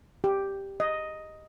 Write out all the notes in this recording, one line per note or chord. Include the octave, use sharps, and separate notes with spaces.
G4
D#5